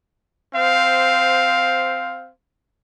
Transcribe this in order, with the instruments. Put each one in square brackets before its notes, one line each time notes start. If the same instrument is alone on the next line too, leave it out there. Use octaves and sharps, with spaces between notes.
[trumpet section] C4 C5 F5